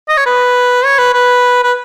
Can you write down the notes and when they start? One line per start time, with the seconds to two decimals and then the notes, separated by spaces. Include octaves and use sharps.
0.09 D#5
0.17 C#5
0.26 B4
0.85 C#5
0.99 B4
1.14 B4
1.63 B4